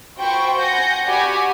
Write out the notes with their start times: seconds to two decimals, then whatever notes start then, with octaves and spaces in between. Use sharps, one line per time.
0.18 F4 F#4 C5 G5 B5 C#6
0.58 F#5 G#5 G6 A#6
1.06 F#4 G4 D5 G#5 B5 D6